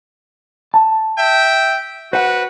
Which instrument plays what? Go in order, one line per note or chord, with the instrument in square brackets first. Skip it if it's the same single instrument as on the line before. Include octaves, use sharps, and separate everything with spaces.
[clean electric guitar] A5
[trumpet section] E5 G5
[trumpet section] F#4 B4 [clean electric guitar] C5 F#5